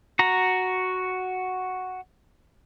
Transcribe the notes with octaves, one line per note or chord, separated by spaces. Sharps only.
F#4 A#5